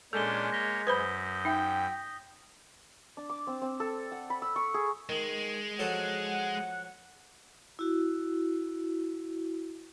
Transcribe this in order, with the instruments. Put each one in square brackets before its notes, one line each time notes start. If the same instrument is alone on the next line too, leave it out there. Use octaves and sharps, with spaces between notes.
[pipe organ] A#2 C#4 D4 [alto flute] G#3 [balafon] A4 [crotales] G6 G7
[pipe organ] A#3 C#5 [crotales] A#6 B6 G7
[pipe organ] F#2 [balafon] B4 C5 B5 [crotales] D#6 G6 G7
[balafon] D#4 E5 [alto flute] G5
[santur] D4
D6
C4
C4
A4
F#5
B5
E6
C#6
G#4
[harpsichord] D#3 [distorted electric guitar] G#3
[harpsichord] F3 F#3 A4 [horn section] F#5
[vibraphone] E4 F#4